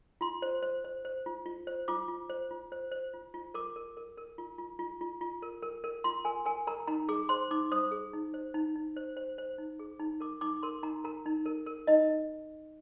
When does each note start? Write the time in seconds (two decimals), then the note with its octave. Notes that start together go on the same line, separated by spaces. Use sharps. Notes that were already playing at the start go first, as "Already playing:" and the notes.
0.21 F4 C6
0.42 C5
0.63 C5
0.84 C5
1.05 C5
1.26 F4
1.46 F4
1.67 C5
1.88 F4 D6
2.08 F4
2.30 C5
2.51 F4
2.72 C5
2.92 C5
3.14 F4
3.34 F4
3.54 A#4 D6
3.76 A#4
3.97 A#4
4.18 A#4
4.38 F4
4.58 F4
4.79 F4
5.01 F4
5.21 F4
5.42 A#4
5.62 A#4
5.84 A#4
6.04 F4 C6
6.25 A#4 G#5
6.46 A#4 G#5
6.67 A#4 A#5
6.88 D#4 A#5
7.09 G#4 D6
7.29 C5 C6
7.51 D#4 D6
7.72 C5 D#6
7.91 G#4
8.13 D#4
8.34 C5
8.54 D#4
8.76 D#4
8.96 C5
9.17 C5
9.38 C5
9.58 D#4
9.79 G#4
10.00 D#4
10.20 A#4 D6
10.41 D#4 D6
10.63 A#4 C6
10.83 D#4 A#5
11.04 A#4 A#5
11.26 D#4
11.46 A#4
11.66 A#4
11.87 D#4 D#5